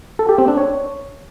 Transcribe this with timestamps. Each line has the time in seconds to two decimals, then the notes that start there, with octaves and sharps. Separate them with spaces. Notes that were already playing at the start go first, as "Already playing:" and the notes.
0.19 A4
0.29 G4
0.38 C4
0.48 D4
0.58 C#5